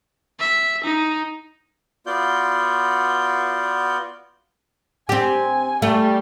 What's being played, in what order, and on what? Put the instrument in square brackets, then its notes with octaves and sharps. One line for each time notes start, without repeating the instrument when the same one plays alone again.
[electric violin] E5
D#4
[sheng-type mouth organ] B3 F4 F#4 D5 G6
[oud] C4 G4 [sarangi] G#5
[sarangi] G3 [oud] A3